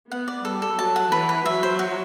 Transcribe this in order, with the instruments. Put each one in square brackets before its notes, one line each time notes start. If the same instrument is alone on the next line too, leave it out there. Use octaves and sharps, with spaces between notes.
[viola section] B3 [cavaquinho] F#5
[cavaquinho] D5
[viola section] G3 [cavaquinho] A4
[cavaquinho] A4
[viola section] F#3 [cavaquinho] A5
[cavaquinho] F#5
[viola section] E3 [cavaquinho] B4
[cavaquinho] B4
[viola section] F#3 [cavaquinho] E5
[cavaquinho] C5
F#4